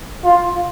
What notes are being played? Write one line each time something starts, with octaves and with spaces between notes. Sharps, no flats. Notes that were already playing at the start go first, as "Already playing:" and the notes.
F4